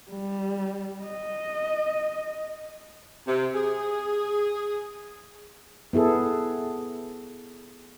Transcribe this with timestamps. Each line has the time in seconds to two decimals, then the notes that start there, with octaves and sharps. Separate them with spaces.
0.11 G3
1.04 D#5
3.27 C3
3.55 G#4
5.93 B3 E4 G#4 A4